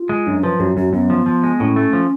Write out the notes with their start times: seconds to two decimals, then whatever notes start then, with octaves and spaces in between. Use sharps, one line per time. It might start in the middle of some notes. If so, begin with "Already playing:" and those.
Already playing: F4
0.09 G#3
0.26 F#2 D4
0.43 F3 B4
0.60 F#2 F#4
0.77 F#2 F#4
0.93 F#2 B3
1.10 F3
1.26 F3
1.43 G#3
1.60 A2 C#4
1.76 A3
1.93 F3